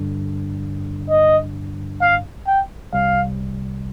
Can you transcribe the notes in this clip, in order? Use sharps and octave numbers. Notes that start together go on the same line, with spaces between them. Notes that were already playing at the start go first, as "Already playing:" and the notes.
Already playing: G2 D3 G3 D4
D#5
F5
G5
C2 C3 G3 F5